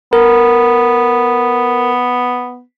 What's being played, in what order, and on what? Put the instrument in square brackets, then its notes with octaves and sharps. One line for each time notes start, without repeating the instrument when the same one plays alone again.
[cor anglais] B3 [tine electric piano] A#4